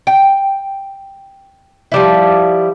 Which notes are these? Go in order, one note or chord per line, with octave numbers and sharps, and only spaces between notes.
G5
F3 G3 E4